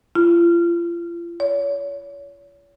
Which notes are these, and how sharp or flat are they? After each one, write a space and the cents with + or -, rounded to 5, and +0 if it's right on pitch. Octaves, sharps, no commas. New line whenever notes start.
F4 -35
C#5 +35